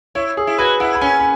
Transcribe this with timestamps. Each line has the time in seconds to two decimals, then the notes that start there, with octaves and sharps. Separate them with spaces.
0.15 E4 C#5
0.37 G#4
0.47 E4
0.58 F#4 B4
0.80 E4 F#5
0.95 B5
1.01 C#4 G#5
1.19 B5